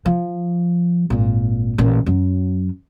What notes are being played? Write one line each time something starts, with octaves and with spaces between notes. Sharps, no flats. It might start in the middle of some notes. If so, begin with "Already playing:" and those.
F3
G#1 A#2
A1 A#2
F#2 F#3